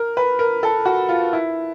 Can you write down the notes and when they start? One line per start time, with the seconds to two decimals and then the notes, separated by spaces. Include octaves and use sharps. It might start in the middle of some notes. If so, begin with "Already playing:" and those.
Already playing: A#4
0.17 B4
0.39 A#4
0.63 A4
0.85 F#4
1.09 F4
1.33 E4